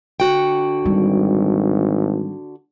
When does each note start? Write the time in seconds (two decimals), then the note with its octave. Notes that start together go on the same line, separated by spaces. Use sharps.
0.20 D3 F#4 G5
0.85 G#1 G3